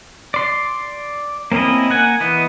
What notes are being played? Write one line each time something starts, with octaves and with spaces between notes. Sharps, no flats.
D5 C6
A#3 C4 C#4 E4 D#5
A#3 F#5 G#5
E3 B3 D#5